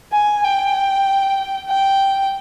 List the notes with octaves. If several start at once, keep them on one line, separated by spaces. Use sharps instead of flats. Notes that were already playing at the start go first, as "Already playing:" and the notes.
G#5
G5
G5